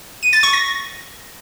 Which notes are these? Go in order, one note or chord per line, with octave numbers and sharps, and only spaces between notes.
D#7
A6
C#6
A#6